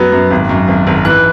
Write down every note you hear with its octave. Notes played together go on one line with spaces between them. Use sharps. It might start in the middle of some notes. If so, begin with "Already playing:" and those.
Already playing: F#2 F#3 B3
F#2
G#1
F#2
G#1
G#1
E3 F#6